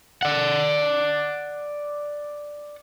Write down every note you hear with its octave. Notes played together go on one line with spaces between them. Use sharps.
D5 F#5